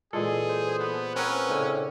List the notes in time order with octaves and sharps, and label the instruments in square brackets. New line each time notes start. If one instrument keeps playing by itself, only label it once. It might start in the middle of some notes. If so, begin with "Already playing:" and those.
[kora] A#2 G#3 [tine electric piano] E3 A4 [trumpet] G#4
[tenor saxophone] C5
[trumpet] B3
[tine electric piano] C4 A#4 F#5 [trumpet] C#4 [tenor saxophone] B4
[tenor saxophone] A2 [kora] C#3 D4